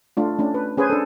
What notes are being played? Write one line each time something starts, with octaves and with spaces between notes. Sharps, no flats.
A3 D4 F4
A3 C#4 D4
B4
C#4 G#4 B4 C5 G#5
D4 A4